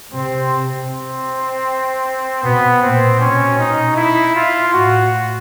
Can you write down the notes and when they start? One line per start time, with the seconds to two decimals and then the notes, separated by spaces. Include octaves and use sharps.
0.12 C3 C4
0.89 C4
2.43 B2 B3
2.81 A#2 C4
3.20 B2 C#4
3.59 D#4
3.96 E4
4.35 F4
4.73 A2 F#4